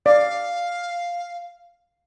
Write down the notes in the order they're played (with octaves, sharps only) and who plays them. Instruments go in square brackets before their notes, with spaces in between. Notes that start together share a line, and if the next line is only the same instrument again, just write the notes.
[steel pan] D5 [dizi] F5